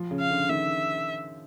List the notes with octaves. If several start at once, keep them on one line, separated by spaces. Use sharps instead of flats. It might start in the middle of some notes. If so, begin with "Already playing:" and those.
Already playing: F3
C#3
F5
D3
D#3 E5